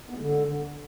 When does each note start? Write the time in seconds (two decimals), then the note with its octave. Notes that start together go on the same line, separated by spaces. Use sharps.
0.10 B3
0.15 G#3
0.20 D3